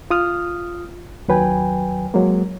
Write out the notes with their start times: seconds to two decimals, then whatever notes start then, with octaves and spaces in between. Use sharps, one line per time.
0.10 F4 D#6 F6
1.28 D#2 F#3 B4 G5 G#5
2.14 F#3 G#3 A#3